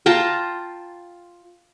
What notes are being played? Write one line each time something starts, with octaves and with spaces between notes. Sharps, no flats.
F4 G5 A5 A#5